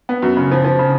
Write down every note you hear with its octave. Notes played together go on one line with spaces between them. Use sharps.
B3
F#2
C#3
F3
F3
C#3